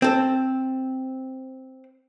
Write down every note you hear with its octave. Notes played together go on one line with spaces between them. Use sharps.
C4 A4